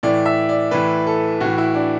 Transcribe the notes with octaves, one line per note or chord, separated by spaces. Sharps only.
A2 E3 D5
E5
D5
A2 E3 B4
A4
A2 E3 F#4
E4
D4